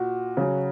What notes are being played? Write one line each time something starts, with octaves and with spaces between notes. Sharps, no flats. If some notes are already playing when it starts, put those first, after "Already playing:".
Already playing: A#2 F#4
C#3 F#3